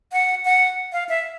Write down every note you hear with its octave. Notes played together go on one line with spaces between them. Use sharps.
F#5
F#5
F5
E5